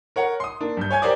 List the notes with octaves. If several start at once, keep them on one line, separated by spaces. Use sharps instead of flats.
A#4 C#5 F#5
C6 D#6
A#3 D4
G2 G6
C#5 G#5 G#6
G4 A#4 C5 D5 D6 D#6